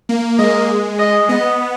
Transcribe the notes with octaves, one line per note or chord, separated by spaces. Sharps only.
A#3
G#3 D#5
D#5
B3 D#5